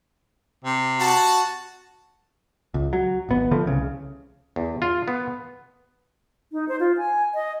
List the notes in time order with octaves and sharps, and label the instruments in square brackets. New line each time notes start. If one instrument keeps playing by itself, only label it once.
[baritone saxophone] C3
[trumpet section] F#4 A5
[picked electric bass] C#2
F#3
D1 G#1 B3
D3 F3 A3
C2 C#3
[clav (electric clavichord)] E2
F4
B3
[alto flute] D#4
C5
F4
G#5
D#5